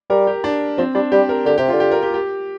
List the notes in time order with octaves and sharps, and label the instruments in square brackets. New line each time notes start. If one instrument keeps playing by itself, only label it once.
[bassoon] G3 [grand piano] A#4
[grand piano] G4
D4
[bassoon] F3 [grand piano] C4
[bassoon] G3 [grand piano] D4
[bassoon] G3 [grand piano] G4
[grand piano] A#4
[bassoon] D3 [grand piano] G4
[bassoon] C3 [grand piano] G4
[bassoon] D3 [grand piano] F4
[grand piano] G4
A#4
G4
G4